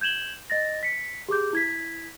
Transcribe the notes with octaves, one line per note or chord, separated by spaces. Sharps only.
G6 G#6 E7 F#7 G7
D#5 A6 A#6
B6 C#7
G4 G#4 D6 G6
E4 G#6 B6